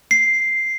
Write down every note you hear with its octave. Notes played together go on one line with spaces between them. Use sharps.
C7